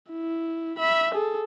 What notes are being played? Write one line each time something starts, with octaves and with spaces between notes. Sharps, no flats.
E4
E5 B5
G#4 A4